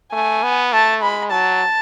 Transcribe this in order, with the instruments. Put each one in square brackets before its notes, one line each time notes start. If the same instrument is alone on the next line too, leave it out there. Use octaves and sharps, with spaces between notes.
[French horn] A3 [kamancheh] G#5
[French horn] B3
[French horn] A3 [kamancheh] A5
[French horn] G#3 [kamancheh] B5
[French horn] F#3 [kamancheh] A5